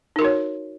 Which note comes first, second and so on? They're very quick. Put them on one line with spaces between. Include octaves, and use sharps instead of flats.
D#4 A#4 F#4 C#5